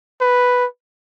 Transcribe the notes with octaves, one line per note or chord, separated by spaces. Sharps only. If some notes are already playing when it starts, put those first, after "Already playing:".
B4